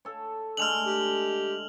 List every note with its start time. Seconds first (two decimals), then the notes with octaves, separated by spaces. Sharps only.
0.05 A4 C#5
0.57 D3 G#3 A3 F6 F7 F#7
0.86 G4